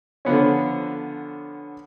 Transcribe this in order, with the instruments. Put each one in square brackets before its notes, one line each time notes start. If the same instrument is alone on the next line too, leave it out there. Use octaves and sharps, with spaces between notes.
[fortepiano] D3 F3 B3 C#4